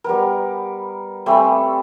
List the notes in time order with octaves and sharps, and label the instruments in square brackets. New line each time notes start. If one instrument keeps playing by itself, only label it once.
[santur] G3 B3 A#4
[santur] G3 A3 C4 [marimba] G5 G#5 B5